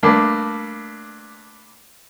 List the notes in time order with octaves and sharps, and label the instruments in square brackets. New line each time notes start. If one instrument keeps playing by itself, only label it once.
[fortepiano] G2 A3 A#3 D4